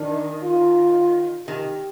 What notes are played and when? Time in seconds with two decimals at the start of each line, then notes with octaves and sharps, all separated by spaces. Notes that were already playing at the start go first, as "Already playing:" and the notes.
Already playing: D#3 D4
0.43 F4
1.47 D#3 G4